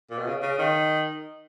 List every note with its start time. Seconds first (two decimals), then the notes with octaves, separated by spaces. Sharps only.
0.11 A#2
0.19 B2
0.27 C#3
0.42 C#3
0.59 D#3